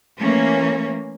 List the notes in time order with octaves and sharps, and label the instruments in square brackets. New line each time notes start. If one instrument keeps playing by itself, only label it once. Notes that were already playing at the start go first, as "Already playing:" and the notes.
[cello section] E3 A3 A#3 C#4